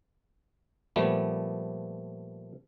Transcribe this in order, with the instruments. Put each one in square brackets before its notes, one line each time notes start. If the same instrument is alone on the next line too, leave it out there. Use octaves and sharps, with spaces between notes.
[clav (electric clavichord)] A#2 F3 G3 A3 B3